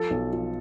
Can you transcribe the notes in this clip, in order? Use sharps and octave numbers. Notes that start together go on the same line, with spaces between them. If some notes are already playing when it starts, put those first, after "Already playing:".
Already playing: F3 A4
B1
F3